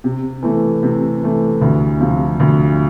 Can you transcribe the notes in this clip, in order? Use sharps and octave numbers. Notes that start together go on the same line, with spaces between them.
C3
E3 A3
C3
E3 A3
D2
C3 F3
D2